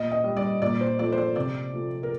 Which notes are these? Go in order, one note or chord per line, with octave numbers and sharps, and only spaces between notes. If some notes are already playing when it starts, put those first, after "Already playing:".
Already playing: A#2 D#5
D#5
G3
D5
A#2 D5
C5
F3 A3 D5
C5
D5
C3 D5
F3 A3
A#4